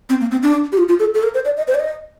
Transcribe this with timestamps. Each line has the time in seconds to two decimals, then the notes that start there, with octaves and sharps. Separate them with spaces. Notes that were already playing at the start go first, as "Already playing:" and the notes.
0.10 C4
0.21 A#3
0.31 C4
0.43 D4
0.72 G4
0.78 F4
0.89 F4
1.00 A4
1.15 A4
1.23 A#4
1.34 C5
1.45 D5
1.57 D#5
1.68 C5
1.75 D5
1.80 D#5